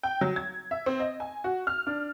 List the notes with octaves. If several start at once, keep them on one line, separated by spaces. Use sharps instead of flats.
G5
F#3
G#6
E5
C4
D#5
G#5
F#4
F6
D4